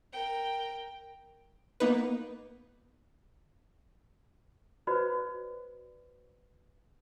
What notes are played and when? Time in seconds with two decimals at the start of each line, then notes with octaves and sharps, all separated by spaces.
0.12 A#4 G5
1.80 A#3 B3 D#4 B4
4.87 F#4 B4 C5 D5